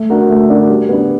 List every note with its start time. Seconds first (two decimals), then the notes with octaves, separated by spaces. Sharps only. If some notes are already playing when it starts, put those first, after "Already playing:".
Already playing: A3
0.10 D4 F#4 A#4
0.30 A3
0.50 D4 F#4 A#4
0.70 G3
0.89 B3 D4